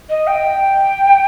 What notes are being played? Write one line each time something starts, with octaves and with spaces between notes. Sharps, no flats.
D#5
G5